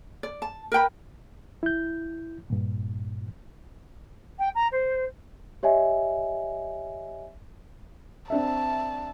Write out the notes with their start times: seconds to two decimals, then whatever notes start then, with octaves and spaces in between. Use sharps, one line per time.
0.23 D5
0.42 A5
0.72 A#4 B4 G5 B5
1.63 E4 G6
2.50 G2 A#2
4.38 G5
4.54 A#5
4.71 C5
5.63 G4 C#5 D#5 E5 G#5
8.30 C4 D4 E5 A5